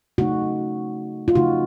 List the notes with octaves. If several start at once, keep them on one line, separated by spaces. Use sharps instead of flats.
C#3 A3 D#4 F#4
F4
C#3 F3 A3 D#4 F#4